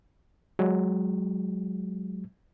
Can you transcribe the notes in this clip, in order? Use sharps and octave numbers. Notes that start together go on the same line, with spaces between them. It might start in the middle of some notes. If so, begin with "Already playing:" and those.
F#3 G#3